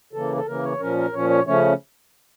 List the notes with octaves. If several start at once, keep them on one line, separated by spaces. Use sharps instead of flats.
C#3 E3 A#3 A4
A4
C#3 E3 A#3 A#4
C#5
A#2 F3 C#4 A#4
A#4
A#2 F3 C#4 C#5
C#5
C#3 F3 A3 C#4 C#5